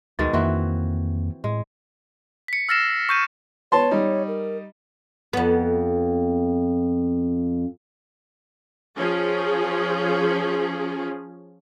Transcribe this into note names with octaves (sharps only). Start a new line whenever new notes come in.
D2 B2 D#3 G#3 A6
F2 D#3 E3 A#3 C4 F#4
A2 G#3
B6 C#7
E6 F6 A6 A#6 C7 E7
C#6 G6 D#7
B3 C#5 A5 C6
G3 D#4
A#4
F2 B3
F3 C#4 G#4